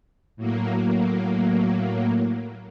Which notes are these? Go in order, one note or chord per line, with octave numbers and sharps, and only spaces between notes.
A2 F#3 A#3